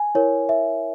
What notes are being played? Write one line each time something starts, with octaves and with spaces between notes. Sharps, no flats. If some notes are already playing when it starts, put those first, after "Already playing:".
Already playing: G#5
E4 A#4 C#5
E5